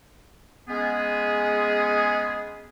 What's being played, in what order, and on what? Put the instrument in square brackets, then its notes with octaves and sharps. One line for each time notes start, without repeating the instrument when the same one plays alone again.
[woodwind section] G#3 B3 C#4 G#4